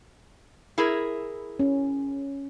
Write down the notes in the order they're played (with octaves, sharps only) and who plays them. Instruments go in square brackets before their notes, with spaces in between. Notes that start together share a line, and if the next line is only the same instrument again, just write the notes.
[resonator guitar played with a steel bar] E4 G#4 A#4
[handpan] C#4